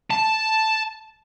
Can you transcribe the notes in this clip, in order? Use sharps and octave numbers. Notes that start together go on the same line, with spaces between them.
A5